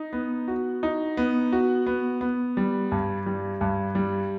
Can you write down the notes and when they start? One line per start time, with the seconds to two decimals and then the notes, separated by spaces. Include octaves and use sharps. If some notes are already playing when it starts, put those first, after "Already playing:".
Already playing: D#4
0.13 B3
0.48 F#4
0.83 D#4
1.17 B3
1.52 F#4
1.86 B3
2.21 B3
2.57 G3
2.92 G2
3.26 G3
3.61 G2
3.95 G3